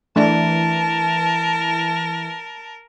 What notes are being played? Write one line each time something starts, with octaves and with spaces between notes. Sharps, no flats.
E3 A3 D4 A#4 A5